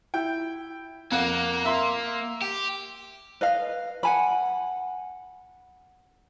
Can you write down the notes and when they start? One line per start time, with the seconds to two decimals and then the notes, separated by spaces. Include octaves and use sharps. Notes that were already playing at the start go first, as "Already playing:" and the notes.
0.14 E4 G5
1.11 F2 A#3 F#5
1.65 E5 C6 E6
2.42 G4
3.41 B4 D#5 F5
4.03 F#5 G#5 B5